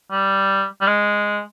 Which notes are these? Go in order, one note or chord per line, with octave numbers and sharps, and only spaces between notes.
G3
G3
G#3